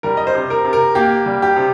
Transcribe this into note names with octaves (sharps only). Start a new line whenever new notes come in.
G3 A#4
D#5
C5
C3
A#4
C3
A#4
A#3 G4
G3
G4
C3